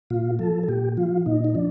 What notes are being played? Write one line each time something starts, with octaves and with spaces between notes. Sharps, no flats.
A#2 F4
F3 A4
A4
A#2 G4
F3 F4
A#2 D#4
D#4
F3 D4